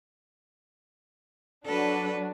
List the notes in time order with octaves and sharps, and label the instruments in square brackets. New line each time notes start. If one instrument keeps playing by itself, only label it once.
[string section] F#3 D4 F#4 [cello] A4 B4